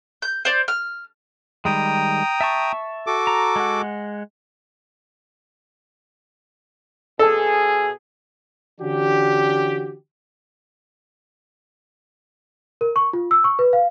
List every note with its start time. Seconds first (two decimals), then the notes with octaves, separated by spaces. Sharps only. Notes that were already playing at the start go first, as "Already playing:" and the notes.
0.22 G6
0.45 C5 D5
0.68 F6
1.65 D#3 G3 G#3 G5 A#5 D#6
2.41 E5 A5 C#6
3.07 F#4 A4 D6
3.27 A#5
3.56 G#3 F#5
7.19 B2 G#4 A4
8.80 D3 E3 C#4 D4 F#4 G4
12.81 A#4
12.96 C#6
13.13 F4
13.31 E6
13.44 C#6
13.59 B4
13.73 F5